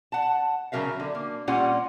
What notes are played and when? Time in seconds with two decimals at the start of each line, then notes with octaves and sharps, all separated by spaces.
0.12 F#5 A5
0.72 C#3 F#3 A#4 E5 F5
1.00 D3
1.15 A#3
1.47 A#2 G3 C#4 F4 F#5